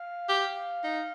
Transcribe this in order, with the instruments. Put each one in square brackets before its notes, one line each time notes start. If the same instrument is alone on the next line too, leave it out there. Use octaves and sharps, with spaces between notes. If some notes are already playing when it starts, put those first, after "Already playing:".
Already playing: [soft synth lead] F5
[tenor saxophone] G4
D#4